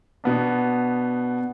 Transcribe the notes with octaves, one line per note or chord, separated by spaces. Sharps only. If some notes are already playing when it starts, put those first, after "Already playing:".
B2 B3 D4